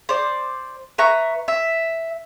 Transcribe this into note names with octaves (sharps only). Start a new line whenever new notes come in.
C5 D5
B4 E5 A#5 C#6
E5